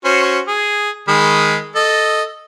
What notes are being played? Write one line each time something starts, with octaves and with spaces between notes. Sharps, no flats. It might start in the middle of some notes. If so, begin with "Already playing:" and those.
C#4 F#4 C5
G#4
D#3 G#3 B5
A4 D#5